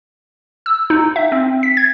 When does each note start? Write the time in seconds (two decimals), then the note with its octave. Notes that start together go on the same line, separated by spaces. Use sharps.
0.66 E6
0.90 D#4
1.16 E5
1.32 C4
1.63 B6
1.77 G#6